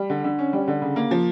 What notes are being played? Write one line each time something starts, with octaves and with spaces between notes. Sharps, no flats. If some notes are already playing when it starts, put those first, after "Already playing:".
Already playing: G3
D3
D3
C#4
G3
D3
C#3
A#3
F3